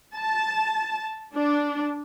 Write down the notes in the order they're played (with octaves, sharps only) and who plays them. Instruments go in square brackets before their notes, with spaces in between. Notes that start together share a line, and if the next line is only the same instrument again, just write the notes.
[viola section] A5
D4